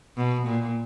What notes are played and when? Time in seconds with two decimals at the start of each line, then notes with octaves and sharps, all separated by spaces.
0.17 B2
0.47 A#2